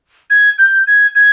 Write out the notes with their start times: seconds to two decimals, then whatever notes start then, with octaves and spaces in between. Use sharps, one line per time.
0.30 G#6
0.59 G6
0.87 G#6
1.15 G#6